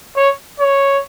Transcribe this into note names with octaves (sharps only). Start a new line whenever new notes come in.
C#5
C#5